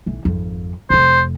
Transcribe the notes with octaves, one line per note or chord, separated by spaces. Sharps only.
B1 E3
G#1 F2
F1 F2 C5